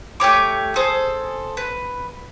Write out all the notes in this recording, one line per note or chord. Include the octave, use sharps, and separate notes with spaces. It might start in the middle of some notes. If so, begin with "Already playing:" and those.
A3 G4 C#5 D6
G#4 A4 C5
B4